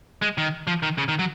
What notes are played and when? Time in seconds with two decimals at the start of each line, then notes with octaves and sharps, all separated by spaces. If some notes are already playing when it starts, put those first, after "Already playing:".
0.22 G#3
0.38 D#3
0.67 F3
0.83 D#3
0.98 C#3
1.08 D#3
1.19 F#3